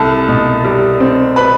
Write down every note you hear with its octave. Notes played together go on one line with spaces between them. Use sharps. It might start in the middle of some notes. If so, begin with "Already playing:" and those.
Already playing: C2 A4 A5
B2
G3
C4
B4 B5